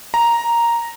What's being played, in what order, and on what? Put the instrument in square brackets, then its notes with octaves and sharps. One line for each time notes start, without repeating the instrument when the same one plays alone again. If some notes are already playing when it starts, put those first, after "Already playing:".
[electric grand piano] A#5